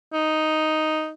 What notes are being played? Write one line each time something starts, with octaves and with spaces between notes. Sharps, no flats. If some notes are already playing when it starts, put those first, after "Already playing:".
D#4